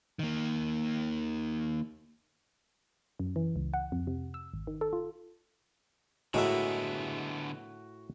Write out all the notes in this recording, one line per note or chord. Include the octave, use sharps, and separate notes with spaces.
D#3 A#3
F#2
E3
C#2
F#5
F2
C3
E6
G#1
D#3
A4
F4
A2 D3 G#3 B3 F#4 A#4 D#5 E5